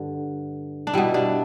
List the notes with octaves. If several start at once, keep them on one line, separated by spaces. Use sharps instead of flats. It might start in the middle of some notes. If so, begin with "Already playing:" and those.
Already playing: G2 D3
D4
B2 G3 E4
D4